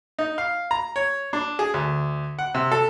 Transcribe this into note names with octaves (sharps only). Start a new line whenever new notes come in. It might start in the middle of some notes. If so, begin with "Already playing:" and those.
D#4
F5
A#5
C#5
D4
G#4
D2
F#5
C3
A4